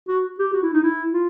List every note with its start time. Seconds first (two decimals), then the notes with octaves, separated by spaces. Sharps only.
0.08 F#4
0.39 G4
0.54 F#4
0.63 E4
0.74 D#4
0.83 E4
1.13 F4